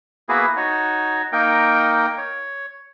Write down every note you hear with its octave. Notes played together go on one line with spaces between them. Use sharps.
A#3 B3 E4 F#4 G#4 B4
D#4 F#4 C#5
A#3 D#4 A#4 G5
C#5